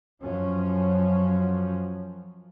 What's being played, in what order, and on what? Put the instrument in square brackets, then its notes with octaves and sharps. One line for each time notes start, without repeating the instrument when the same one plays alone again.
[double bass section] F#2 F3 C#4